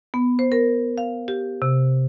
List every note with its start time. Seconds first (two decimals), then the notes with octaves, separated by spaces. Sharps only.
0.14 B3
0.39 C5
0.52 A#4
0.98 F5
1.28 G4
1.62 C3